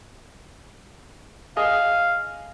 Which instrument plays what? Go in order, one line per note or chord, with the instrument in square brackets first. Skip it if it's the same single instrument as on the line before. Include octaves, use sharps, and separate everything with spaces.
[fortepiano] G#4 D#5 [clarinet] F5